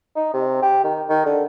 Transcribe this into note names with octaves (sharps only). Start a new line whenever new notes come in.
D#4
C3
G4
D#3
D#3
D3